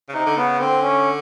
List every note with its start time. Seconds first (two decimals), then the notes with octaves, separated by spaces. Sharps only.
0.09 C#3
0.14 C3 D#4
0.26 D3
0.36 C#3 B3
0.60 D3 C4
0.82 C#4